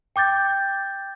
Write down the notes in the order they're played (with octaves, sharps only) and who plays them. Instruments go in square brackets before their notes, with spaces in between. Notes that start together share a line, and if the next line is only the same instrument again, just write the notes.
[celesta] G5 D6 G6 A6